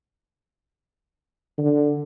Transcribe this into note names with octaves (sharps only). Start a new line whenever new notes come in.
D3